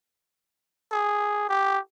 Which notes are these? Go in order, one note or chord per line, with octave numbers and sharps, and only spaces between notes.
G#4
G4